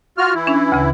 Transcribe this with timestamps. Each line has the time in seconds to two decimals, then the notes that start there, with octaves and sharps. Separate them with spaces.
0.18 F4 F#4 F6
0.34 E3 E4
0.47 C#4 D4
0.72 D2 C#3